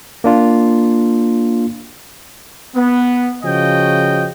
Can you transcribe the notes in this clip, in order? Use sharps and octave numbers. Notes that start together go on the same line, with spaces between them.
A#3 D4 F4
B3
C#3 F3 F#4 D#5 G5